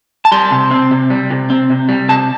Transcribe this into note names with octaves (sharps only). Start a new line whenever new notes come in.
A5
G3 C6
C3
C4
C3
G3
C3
C4
C3
G3
C3 A5